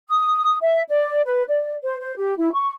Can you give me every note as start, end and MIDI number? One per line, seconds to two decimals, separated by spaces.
0.09 0.57 87
0.61 0.81 76
0.88 1.20 74
1.25 1.43 71
1.47 1.73 74
1.83 1.98 72
1.99 2.14 72
2.17 2.34 67
2.37 2.49 64
2.54 2.71 85